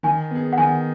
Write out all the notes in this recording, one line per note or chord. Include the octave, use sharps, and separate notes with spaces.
D#3 G#5
B3 G#4
F#5
D#3 G#5